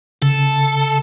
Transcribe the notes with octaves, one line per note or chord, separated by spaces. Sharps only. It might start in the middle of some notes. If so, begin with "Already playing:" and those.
C#3 A4